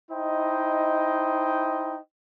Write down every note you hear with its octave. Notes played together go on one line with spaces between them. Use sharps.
D#4 E4 C5 D#5 G5